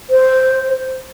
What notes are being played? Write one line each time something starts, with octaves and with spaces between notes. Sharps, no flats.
C5